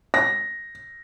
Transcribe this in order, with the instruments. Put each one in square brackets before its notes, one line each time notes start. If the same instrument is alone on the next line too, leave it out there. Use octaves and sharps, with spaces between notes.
[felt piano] A#6